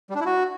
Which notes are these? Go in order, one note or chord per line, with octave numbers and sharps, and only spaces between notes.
G3
D4
E4
F#4